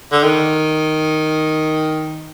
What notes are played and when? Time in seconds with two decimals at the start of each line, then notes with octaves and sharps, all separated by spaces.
0.12 D3
0.24 D#3